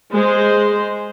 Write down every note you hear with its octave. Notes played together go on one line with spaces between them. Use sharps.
G#3 C5